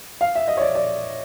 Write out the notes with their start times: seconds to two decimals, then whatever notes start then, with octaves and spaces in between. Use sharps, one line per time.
0.21 F5
0.35 E5
0.48 D#5
0.57 C#5
0.61 D5
0.75 D5